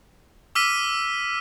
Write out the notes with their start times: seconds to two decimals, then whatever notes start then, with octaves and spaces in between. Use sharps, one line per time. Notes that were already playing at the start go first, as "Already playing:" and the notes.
0.55 D6 E6 F6 B6 D#7